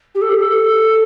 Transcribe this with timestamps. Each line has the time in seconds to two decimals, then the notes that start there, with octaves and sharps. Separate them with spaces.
0.15 G4
0.22 A4
0.29 G4
0.41 A4